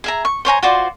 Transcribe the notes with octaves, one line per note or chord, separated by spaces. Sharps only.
G#4 E5 A#5
C#6
C5 C#5 G#5 A#5
F4 F#4 C5 D5